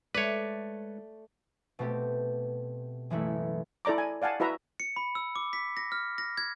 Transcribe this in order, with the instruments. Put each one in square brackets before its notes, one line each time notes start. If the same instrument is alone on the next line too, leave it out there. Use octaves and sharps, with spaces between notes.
[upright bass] G#3 [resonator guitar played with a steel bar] A3 D5 [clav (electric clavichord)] B4 C#5
[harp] B2 A3 C4 G4
F#1 E3 G#3 A3 E4
[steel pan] E4 A4 D5 A#5 D6
G#5
D5 F5 F#5 G#5 A5
E4 F#4 B4 E5 A#5
[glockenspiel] C#7
B5
E6
D6
B6
A#6
F6
A#6
G#6